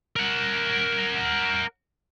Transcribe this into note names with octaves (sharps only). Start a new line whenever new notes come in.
A#4 F#5